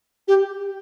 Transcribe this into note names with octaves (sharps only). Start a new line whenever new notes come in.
G4